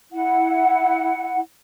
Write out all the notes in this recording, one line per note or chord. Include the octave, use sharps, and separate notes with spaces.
E4 F#5